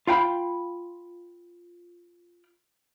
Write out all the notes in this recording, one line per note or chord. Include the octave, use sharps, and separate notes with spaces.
F4 F5 G5 B5